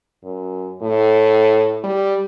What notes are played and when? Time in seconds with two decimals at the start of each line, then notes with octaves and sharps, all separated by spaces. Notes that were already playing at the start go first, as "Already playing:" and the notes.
0.24 F#2
0.82 A2
1.84 G3